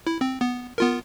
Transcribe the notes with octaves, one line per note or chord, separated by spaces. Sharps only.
E4
C4
B3
B3 F4 A#4